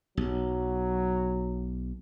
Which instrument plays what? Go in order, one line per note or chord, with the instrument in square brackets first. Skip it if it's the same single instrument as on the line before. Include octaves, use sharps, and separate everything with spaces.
[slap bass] B1 [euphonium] F#3